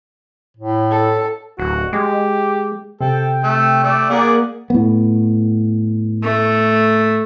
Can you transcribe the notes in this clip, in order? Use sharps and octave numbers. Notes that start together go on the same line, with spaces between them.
A2
A4
D1 F#4
G#3 G4
C3 A4 G5
A3
A3 D5
A#3 G#4 D5 F#5
A2 B3
A3